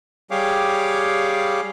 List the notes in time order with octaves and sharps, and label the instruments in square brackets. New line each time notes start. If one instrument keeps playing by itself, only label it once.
[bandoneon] G3 G4 G#4 C#5 F5 D6